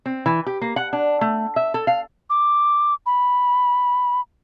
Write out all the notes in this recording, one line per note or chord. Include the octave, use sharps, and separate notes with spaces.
C4
E3
G4
A#3
F#5
D4
A3
E5
A4
F5
D6
B5